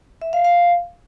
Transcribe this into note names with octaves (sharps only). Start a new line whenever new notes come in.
E5
F5
F5